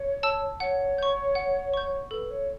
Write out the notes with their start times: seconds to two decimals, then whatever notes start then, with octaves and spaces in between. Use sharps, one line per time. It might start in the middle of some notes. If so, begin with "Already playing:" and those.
Already playing: C#5
0.23 A5 E6
0.60 C#5 F#5
0.98 C#6 G6
1.35 F#5
1.74 C#6 G6
2.11 A4 B4
2.30 C#5